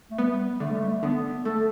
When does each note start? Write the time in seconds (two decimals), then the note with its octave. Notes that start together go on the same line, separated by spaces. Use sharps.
0.11 A3
0.18 G3 B3
0.60 D3 A3
0.70 G3
0.80 A3
1.03 D3 B3
1.45 A3 A4